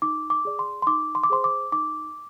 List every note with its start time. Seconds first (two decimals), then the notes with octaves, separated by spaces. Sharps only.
0.02 D#4 D6
0.30 D6
0.45 G#4 D5
0.59 C6
0.82 C6
0.87 D#4 D6
1.15 C6
1.23 D6
1.30 G#4 C5 C6
1.44 D6
1.72 D#4 D6